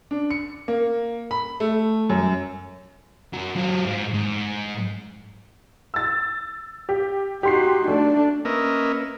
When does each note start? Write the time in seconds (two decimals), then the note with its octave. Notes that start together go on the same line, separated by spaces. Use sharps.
0.11 D4
0.30 C#7
0.68 A#3
1.31 B5
1.60 A3
2.10 F#2
3.34 F#2 F#3
3.56 F#3 F4
3.86 G#2
4.14 G#2
5.94 E6 A6
6.89 G4
7.43 D#4 F#4 G4 C6 C7
7.88 A3 D4
8.45 A#3 C#4 A#4 B4 D#5 E5